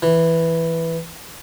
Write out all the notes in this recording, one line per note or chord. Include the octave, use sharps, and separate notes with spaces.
E3